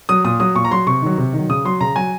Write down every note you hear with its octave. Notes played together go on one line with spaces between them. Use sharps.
F#3 D#6
A#2 D#6
F#3 D#6
A#2 C#6
A#5
F#3 C6
C3 C#6
D#3 F#3
C3
D#3
F#3
C#3 D#6
F#3 C6
C#3 A#5
F#3 G#5